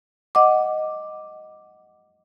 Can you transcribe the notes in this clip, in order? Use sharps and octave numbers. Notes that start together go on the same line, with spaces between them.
D#5 F#5 D6